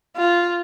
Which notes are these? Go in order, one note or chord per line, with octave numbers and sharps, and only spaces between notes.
F4